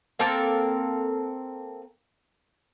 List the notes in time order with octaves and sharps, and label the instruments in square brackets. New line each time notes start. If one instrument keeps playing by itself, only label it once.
[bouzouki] A#3 C4 A4 A#4